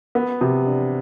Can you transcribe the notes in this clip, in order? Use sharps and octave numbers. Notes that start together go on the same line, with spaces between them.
B3
C3
D4